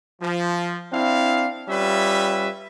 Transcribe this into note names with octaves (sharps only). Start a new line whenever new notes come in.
F3
C4 D4 E4 F5
G3 C#4 F4 B4 E5